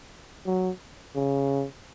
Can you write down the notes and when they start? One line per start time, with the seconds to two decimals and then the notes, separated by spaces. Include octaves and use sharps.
0.46 F#3
1.15 C#3